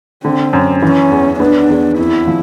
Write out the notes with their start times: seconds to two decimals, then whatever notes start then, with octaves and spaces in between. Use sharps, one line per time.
0.24 D3 C4
0.53 F#2
0.82 E3 C#4
1.11 E2
1.40 B3 D4
1.70 E2
1.98 F2 E4
2.27 F3